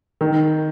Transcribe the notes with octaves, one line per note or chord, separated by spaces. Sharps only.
D#3